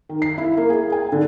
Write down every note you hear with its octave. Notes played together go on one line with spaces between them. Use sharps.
D#3
C7
E4
A#3
G#4
G#5
D3